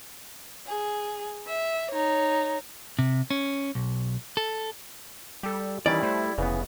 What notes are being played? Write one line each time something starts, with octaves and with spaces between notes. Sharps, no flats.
G#4
E5
D#4 C#5
C3
C#4
B1
A4
G3 G4 A4
D#3 E3 G3 C#4 E4 D5
A3 C5
F1 C#3 E3 B3